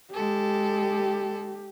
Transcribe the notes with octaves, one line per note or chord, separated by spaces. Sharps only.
G#3 G4 A4